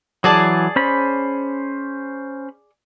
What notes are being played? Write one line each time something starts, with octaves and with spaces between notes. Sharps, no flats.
E3 F#3 G#4 D5 A5
C#4 C5 B5